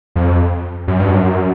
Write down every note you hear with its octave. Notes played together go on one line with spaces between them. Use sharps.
F2
F#2
G2
F#2